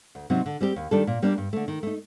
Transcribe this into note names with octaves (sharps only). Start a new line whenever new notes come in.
D2
C3 F#3 C4 D#4
D3
G3 C4 G4
D#2
D#3 G3 D4 A4
A#2
G3 A#3 D4
G2
D3 A3
D#3
A3 D#4